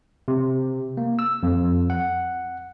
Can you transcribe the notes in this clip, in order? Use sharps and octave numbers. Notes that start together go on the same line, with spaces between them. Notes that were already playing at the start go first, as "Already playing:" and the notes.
C3
A#3
E6
F2
F#5